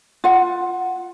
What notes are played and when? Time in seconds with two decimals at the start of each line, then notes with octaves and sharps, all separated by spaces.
0.24 F4 F#5